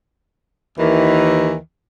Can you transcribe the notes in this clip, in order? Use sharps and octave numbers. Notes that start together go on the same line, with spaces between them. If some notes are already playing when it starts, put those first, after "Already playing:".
D#2 D#3 E3